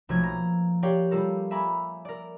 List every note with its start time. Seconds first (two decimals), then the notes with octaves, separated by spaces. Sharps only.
0.09 B1 F3 A3 A#3 G#6
0.24 A#5
0.83 G4 A#4 C#5 D5 F5 G5
1.11 G3 F4 A4 A#4
1.51 E5 G#5 A#5 B5 D6
2.05 A#4 D5